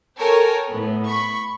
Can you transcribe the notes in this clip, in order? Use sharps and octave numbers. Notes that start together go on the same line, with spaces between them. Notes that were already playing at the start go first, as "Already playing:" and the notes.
A4 A#4 C#5 G5 G#5
A2 B3
B5 C#6